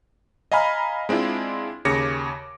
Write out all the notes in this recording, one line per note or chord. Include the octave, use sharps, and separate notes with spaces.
D#5 F5 G#5 A#5 B5 F6
G#3 C4 D4 E4 F4
D#2 C#3 C#5 D6 A#6 C#7